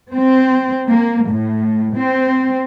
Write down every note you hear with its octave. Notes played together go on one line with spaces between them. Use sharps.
C4
A#3
A2
C4